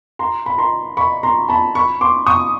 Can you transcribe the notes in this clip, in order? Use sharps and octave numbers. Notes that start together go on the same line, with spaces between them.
A#5 C6
B5
A#5 C6
B5 C#6
A#5 C6
A5 B5
B5 C#6
C6 D6
C#6 D#6